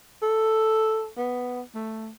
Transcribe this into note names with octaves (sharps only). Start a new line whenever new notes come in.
A4
B3
A3